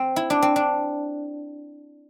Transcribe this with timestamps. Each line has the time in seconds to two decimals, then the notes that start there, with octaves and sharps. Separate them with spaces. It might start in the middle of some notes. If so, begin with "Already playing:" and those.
Already playing: C4
0.16 E4
0.30 D4
0.42 C4
0.56 D4